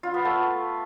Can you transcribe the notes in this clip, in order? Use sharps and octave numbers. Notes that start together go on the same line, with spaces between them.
F4
B3
A3